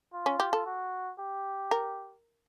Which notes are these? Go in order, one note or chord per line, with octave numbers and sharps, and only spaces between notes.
F4
C#4
G4
A4
F#4
G4
A#4